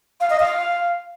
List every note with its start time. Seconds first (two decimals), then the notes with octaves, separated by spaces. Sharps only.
0.20 F5
0.30 D#5
0.40 F5